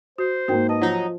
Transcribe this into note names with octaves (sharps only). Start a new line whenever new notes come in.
F#4 C5
G#2 A#3 F#4 A#4 G5
B4 D#5 A5
F3 F#3 D#4